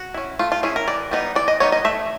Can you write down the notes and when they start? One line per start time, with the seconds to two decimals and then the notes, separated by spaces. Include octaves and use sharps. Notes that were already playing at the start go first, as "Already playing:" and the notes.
Already playing: F#4
0.14 C#4 E4
0.39 A3 F4
0.52 F4
0.63 C#4 E4 G#4
0.76 A#4
0.88 E3 D5
1.11 G3 B3 D#4
1.35 E3 D5
1.48 D#5
1.60 G3 B3 D#4 C#5
1.72 D#5
1.85 A3 E5